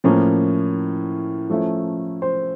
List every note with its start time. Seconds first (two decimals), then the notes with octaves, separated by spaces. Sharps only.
0.04 A2 F3 A#3 C#4 A#4
1.50 F3 A3 C#4 E4
2.22 C5